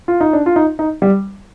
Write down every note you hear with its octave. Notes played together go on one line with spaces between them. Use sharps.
F4
D#4
D4
F4
D#4
D#4
G3